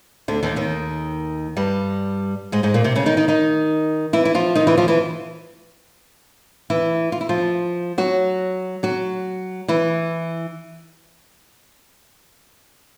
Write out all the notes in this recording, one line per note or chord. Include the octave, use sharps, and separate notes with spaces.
D2 D3
D#2 D#3
D#2 D#3
G2 G3
G#2 G#3
G#2 G#3
A#2 A#3
C3 C4
C#3 C#4
D#3 D#4
D#3 D#4
D#3 D#4
E3 E4
E4
F3 F4
D#3 D#4
E3 E4
F3 F4
E3 E4
E3 E4
F4
E4
F3 F4
F#3 F#4
F#3 F#4
E3 E4